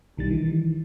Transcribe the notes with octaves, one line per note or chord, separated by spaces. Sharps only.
B1 D#3 G3 A6
D#3 E3